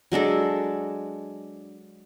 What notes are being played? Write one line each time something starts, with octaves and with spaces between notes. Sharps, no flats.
F#3 G#3 D4 A4